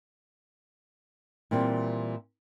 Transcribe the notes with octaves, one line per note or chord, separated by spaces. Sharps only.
A#2 E3 G3 C4